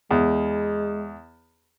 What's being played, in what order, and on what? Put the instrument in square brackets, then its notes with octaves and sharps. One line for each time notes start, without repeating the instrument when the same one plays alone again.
[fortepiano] E2 [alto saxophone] G#3